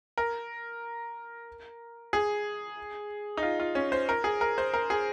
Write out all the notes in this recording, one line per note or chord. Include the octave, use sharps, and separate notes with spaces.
A#4
G#4
D#4
F4
F4
C#4
C5
A#4
G#4
A#4
C5
A#4
G#4